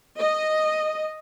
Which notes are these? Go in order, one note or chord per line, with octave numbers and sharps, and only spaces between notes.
D#5